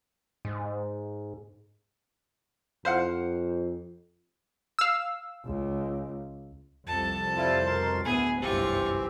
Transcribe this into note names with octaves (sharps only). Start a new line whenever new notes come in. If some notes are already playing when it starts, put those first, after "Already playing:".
G#2
F2 C5 F5 F#5
F5 E6
C#2
C2 F2 A4 A5
G3 E4 F4 C5
B2 A#4 C6
D2 A2 B3 E4 G#4 G#5 B5
G1 C2 F#2 E3 C4 F4 G4 C#6